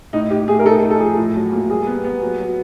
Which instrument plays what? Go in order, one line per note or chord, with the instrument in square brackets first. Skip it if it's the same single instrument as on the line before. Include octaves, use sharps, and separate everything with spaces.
[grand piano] A2 [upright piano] D#4
[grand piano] A2 [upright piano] G4
[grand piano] A3 [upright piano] G#4
[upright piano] A#4
[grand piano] D#4 [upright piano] A4
[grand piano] D#4
[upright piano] A4
[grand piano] F3 [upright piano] G#4
[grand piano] A2
F#3
A#3
[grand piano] G3 [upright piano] G#4
[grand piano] B3
B3
F#3
F#3